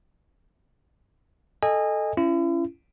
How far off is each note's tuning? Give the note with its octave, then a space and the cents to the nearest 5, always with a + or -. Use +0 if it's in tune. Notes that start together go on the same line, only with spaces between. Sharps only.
A4 +0 D#5 -10 G#5 -25
C#4 +0 E4 +40